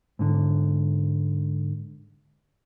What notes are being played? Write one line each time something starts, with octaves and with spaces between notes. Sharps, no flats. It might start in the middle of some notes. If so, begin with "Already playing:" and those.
G#2 D3